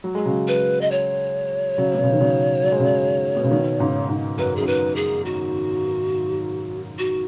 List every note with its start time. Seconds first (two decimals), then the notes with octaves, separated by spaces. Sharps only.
0.04 F#3
0.15 G#3
0.25 C#3 F#3
0.48 B4
0.81 D#5
0.91 C#5
1.78 C#3 F#3
1.95 B2
2.04 C#3
2.13 D#3
2.21 C#3 F#3
2.64 F#3
2.72 G#3
2.80 C#3 F#3
3.37 B2
3.44 C#3
3.51 B2 D#3
3.80 G#2 C#3
4.09 G#2
4.38 F#2 B4
4.56 F#2 G#4
4.67 B4
4.96 G#4
5.25 F#4
6.99 F#4